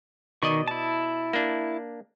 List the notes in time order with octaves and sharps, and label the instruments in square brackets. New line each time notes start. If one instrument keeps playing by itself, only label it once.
[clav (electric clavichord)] B2 D5 D#5 [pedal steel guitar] D#3 C#6
[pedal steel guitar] E4 A5
[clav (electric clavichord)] A#3 D4